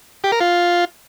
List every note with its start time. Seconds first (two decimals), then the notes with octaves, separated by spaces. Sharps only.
0.24 G4
0.32 A#4
0.40 F4